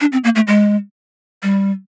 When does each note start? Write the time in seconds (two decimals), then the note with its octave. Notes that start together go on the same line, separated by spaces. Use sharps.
0.01 D4
0.12 C4
0.24 A#3
0.35 A3
0.47 G#3
1.43 G3